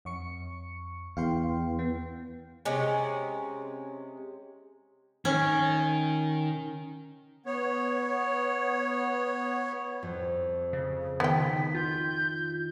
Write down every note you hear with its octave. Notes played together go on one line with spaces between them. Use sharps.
F2 C#6 C#7
E2 F5 G5 C6
B3
C3 G#3 C#4
D#3 C#4
B3 C#5
F2
C#3
D#3 B3 G5 B6
F4 G6